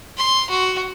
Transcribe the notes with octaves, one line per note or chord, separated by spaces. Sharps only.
C6
F#4